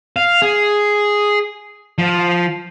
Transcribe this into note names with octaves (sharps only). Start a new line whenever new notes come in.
F5
G#4
F3